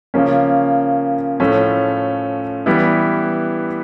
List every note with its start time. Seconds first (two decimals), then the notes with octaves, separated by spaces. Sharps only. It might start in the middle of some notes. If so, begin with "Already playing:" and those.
0.14 C#3 F3 A#3 C#4
1.40 A2 F3 A3 C#4
2.66 E3 G3 B3 E4